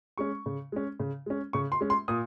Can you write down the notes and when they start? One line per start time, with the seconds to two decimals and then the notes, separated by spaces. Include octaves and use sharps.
0.18 G#3 C#4 C#6
0.46 C#3
0.72 G#3 C#4
0.99 C#3
1.26 G#3 C#4
1.53 C#3 C#6
1.72 C6
1.81 G#3 C#4
1.90 C6
2.08 A#2 D#6